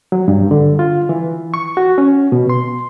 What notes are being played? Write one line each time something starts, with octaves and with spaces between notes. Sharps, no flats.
F#3
G2
D3
F4
E3
C#6
F#4
C#4
B2
C6